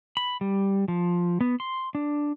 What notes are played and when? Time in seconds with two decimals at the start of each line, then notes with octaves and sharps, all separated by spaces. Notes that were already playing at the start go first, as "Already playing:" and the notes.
0.17 B5
0.41 G3
0.88 F3
1.41 B3
1.60 C6
1.95 D4